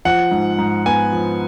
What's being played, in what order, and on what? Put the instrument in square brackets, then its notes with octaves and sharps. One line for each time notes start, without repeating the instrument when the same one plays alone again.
[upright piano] F3 F#5
G#2
G#2
B3 G#5
F3